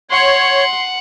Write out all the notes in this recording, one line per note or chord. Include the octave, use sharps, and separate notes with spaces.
C#5 F#5 C6